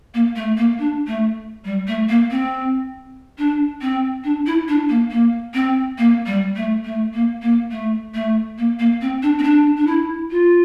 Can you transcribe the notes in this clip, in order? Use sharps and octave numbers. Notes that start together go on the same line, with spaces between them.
A#3
A3
A#3
D4
A3
G3
A3
A#3
C4
D4
C4
D4
E4
D4
A#3
A#3
C4
A#3
G3
A3
A3
A#3
A#3
A3
A3
A#3
A#3
C4
D4
C4
D4
D4
E4
F4